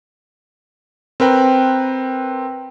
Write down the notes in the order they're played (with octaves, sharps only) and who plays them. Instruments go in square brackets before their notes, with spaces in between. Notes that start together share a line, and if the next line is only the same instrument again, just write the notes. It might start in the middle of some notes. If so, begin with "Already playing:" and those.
[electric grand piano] C4 A#4 B4 G5